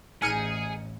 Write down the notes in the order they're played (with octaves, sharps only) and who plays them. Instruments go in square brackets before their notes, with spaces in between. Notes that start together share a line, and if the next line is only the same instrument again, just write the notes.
[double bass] A1 [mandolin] D#4 F6 [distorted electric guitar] G#4 [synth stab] G#5 C#7 D#7